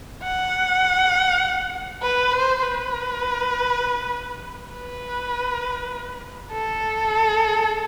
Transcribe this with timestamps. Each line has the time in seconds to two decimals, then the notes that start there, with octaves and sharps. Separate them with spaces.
0.23 F#5
2.02 B4
2.32 C5
2.62 B4
4.72 B4
6.52 A4